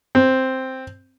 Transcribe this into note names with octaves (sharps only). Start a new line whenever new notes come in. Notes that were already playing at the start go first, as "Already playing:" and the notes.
C4